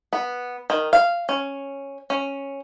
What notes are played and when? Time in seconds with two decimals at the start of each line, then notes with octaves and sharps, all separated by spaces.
0.13 B3
0.70 D#3
0.93 F5
1.29 C#4
2.10 C#4